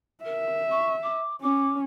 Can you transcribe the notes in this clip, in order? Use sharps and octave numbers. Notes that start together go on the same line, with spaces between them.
A#4 E5
C#6
D6
C#4 D6